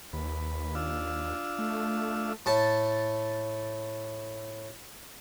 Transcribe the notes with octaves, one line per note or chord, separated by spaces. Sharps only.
D#2 B4
D4 F4 E6
A3
A2 A5